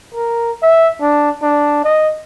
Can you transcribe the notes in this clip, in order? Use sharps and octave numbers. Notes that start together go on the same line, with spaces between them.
A#4
E5
D4
D4
D#5